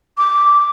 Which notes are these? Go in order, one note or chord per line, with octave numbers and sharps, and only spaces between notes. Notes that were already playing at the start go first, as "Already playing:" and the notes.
D6